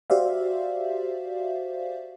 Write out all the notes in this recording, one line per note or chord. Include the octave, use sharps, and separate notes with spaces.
F#4 G4 C5 D5 E5 F5